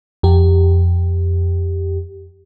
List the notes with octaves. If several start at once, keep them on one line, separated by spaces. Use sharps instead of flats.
F2 G4